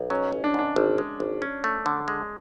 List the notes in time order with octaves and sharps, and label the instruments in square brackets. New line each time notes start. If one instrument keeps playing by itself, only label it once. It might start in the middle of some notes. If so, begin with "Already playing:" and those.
Already playing: [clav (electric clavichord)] B1
[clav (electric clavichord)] F#3 [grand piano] C#4
[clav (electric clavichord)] A1
[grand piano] D4
[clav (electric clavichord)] G#2 [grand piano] D4
[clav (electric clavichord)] G#1
G#3
G#1
C#4
A3
D3
G#3